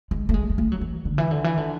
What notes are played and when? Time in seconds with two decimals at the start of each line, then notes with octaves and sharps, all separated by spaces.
0.11 G#3
0.29 A3
0.34 G#3
0.50 G#3
0.58 A3
0.72 F#3
0.81 E3
1.05 D3
1.18 E3
1.31 D3
1.44 E3
1.57 D3